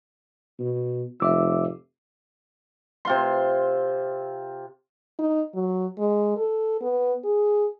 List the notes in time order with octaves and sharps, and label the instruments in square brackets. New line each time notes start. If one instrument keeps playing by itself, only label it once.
[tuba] B2
[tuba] F1 [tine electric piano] E5 D6 E6
[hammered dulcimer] C3 F4 C6
[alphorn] D#4
F#3
G#3
A4
B3
G#4